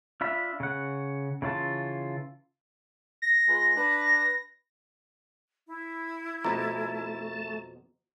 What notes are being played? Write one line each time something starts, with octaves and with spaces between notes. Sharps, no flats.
D4 F4 E5 B5
C#3 F#5
C#3 E3 F4 A5
A#6
G#3 F4 B4
D4 B4
E4
F2 B2 A3 A5 A#5